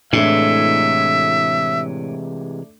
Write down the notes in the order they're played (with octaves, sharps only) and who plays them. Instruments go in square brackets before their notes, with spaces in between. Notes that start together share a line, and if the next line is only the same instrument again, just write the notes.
[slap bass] A2 [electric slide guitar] C3 E3 G#3 [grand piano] A3 D4 [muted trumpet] E5